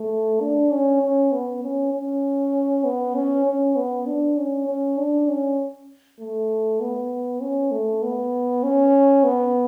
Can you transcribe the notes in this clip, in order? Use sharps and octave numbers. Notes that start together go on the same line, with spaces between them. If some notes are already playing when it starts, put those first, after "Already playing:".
Already playing: A3
D4
C#4
C#4
B3
C#4
C#4
B3
C#4
C#4
B3
D4
C#4
C#4
D4
C#4
A3
B3
C#4
A3
B3
C#4
B3